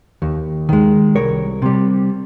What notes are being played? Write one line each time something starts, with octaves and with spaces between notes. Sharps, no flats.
D#2
D#3 G#3
C2 A#4 C#5
C3 G3